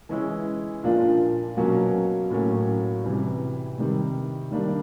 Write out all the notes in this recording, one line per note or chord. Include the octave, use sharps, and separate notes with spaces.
E3 G#3 C#4 E4
A#2 F3 A#3 D4 F4
B2 F#3 A#3 C#4
A2 F#3 A#3 C#4
C3 E3 G3
C3 D#3 G3
D#3 G3 A#3 D4